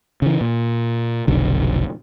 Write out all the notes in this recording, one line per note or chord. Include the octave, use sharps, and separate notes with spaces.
C#3 E3
A#2
F1 B1 D3